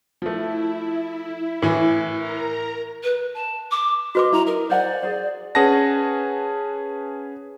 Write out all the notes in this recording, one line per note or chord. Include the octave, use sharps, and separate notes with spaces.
F3 A3 E4
A2 E3
A#4 A#5
B4
A5
D6
F#4 B4 D#5 D6
E4 A#5
A#4 D#5
C5 D5 F#5 G#5
G#4 C5
C#4 G#4 B4 F#5 A5 A#6